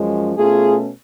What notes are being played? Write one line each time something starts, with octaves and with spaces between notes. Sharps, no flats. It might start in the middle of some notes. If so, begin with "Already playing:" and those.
Already playing: F#2 F3 G#3 C#4
B2 A3 C#4 F4 G#4